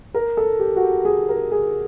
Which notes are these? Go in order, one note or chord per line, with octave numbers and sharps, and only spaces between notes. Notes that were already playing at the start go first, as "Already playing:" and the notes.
A#4
A4
G4
F#4
G4
G#4
A#4
G#4